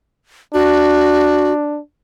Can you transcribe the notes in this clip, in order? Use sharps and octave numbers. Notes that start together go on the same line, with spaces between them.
D4 F#4